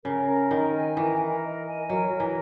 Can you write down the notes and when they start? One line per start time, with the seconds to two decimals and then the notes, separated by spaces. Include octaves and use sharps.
0.04 C#3 A#4
0.27 A#4
0.51 D#3 D#5
0.74 G#5
0.97 E3 A#4
1.20 A#4
1.44 D#5
1.66 G#5
1.90 F#3 A#4
2.12 A#4
2.20 E3